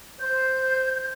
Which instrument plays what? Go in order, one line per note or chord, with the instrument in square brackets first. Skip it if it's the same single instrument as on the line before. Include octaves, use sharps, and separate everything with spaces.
[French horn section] C5 [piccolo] G6